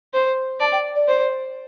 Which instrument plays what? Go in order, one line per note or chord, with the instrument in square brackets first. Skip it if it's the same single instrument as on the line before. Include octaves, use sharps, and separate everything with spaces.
[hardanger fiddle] C5
[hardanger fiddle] D5 [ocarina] A5
[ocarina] G5
D5
[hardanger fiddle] C5